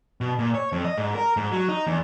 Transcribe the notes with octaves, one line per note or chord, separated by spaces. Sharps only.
B2
A#2
C#5
F2
D#5
G#2
A#4
G#2
F#3
D#4
E2